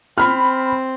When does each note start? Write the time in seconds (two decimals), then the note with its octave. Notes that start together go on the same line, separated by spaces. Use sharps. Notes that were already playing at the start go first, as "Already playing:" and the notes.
0.18 C4 B5 F6